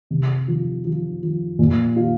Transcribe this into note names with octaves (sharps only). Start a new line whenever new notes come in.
C3
F3
F3
F3
A#2
F4